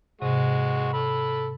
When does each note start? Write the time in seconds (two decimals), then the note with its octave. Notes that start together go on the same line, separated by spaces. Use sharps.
0.21 G#2 C3 G#3 F#4
0.93 A4 B5